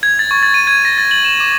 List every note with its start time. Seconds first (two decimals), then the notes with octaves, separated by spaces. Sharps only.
0.03 G#6
0.19 A6
0.31 C#6
0.43 A6
0.54 D#7
0.67 G#6
0.85 A#6
0.98 A6
1.11 F#7
1.25 E7
1.40 D6